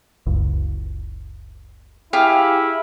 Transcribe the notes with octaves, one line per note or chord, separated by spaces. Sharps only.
F#1 C#2
E4 G4 G#4 F5